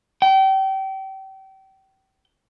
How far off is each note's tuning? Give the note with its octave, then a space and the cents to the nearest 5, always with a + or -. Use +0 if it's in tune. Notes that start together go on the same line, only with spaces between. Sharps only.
G5 -30